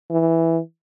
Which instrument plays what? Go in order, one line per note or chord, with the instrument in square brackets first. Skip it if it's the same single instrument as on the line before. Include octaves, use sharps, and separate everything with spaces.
[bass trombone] E3